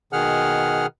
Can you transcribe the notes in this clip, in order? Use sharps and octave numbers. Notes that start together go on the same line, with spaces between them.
B2 D#3 G#4 F#5 F6